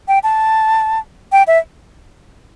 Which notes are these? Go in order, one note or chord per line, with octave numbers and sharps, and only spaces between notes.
G5
A5
G5
E5